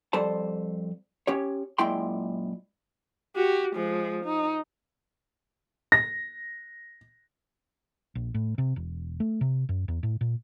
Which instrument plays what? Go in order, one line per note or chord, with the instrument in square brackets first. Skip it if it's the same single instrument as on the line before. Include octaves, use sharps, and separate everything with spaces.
[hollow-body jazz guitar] F2 G3 A4 C5 A5
C#4 G4 C#5
F#2 A#2 G#3 E4 G5 C6
[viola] F#4 G4
F3 G#3
D#4
[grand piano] A#6
[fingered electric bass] A#1
A2
C3
E1
A3
C3
F#2
E2
A2
A#2